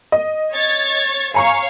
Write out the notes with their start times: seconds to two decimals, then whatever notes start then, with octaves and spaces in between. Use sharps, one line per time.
0.12 D#5
0.52 C#5 G#6 A6
1.34 C#5 F5 G#5 A#5 C#6 C#7